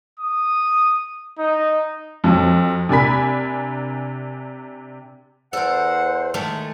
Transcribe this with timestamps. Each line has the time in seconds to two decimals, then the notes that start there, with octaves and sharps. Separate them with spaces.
0.20 D#6
1.39 D#4
2.24 F2 F#3
2.89 C3 D4 A#4 G#5 B5 B6
5.53 E2 A4 A#4 C5 F#5
6.34 D#3 G#3 A3 A5